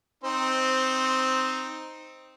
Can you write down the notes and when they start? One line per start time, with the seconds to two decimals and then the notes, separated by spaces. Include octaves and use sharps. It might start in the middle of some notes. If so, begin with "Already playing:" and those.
0.24 C4 D#4 C5